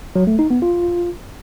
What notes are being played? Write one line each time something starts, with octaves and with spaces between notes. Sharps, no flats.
F#3
A3
D#4
B3
F4